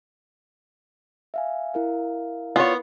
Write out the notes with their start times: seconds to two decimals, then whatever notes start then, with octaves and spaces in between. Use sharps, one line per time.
1.34 E5 F5 G#5
1.74 E4 A#4 F5
2.56 B3 F4 C#5